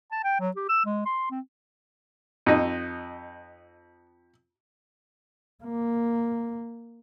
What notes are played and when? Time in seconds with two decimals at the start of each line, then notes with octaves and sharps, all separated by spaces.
0.12 A5
0.24 G5
0.40 F#3
0.56 G4
0.69 E6
0.85 G#3
1.06 C6
1.31 C4
2.46 F2 D#4
5.64 A#3